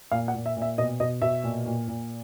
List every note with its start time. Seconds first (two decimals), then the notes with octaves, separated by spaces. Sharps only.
0.12 A#2 F5
0.28 F#5
0.35 A#2
0.46 E5
0.57 A#2
0.62 E5
0.78 B2 D#5
1.00 B2 D#5
1.22 B2 E5
1.44 A#2
1.66 A#2
1.88 A#2